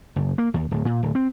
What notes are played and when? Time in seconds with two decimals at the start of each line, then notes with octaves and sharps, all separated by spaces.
0.16 F#1
0.38 A#3
0.54 D#2
0.71 D1
0.85 A#2
1.03 D1
1.15 C4